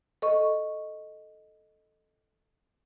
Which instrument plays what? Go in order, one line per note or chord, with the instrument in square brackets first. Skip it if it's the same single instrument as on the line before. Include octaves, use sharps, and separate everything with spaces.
[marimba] A4 D#5 C#6